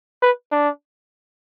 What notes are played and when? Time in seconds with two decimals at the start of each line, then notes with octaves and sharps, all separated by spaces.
0.22 B4
0.51 D4